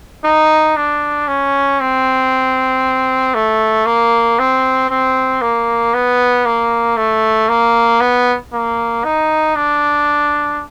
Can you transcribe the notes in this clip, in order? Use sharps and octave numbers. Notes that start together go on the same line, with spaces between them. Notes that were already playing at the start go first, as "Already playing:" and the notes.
D#4
D4
C#4
C4
A3
A#3
C4
C4
A#3
B3
A#3
A3
A#3
B3
A#3
D#4
D4